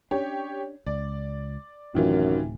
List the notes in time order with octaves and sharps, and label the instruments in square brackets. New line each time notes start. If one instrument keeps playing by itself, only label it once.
[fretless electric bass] C#4 D4 [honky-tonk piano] G4 C#5
[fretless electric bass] C#2 [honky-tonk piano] D5
[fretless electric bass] D1 A2 C3 [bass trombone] F#2 [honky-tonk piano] D#3 E3 F4